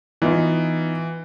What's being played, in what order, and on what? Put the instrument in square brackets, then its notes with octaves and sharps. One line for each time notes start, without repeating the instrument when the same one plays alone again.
[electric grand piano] E3 [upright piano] B3 D#4 F4